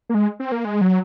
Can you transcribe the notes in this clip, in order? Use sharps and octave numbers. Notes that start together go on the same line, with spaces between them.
A#3
G#3
C4
A#3
G#3
F#3